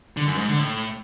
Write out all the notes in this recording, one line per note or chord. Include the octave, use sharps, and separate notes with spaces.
D3
F#2
G#2
D3
A2